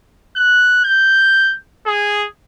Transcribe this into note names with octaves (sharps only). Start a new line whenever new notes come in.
F#6
G6
G#4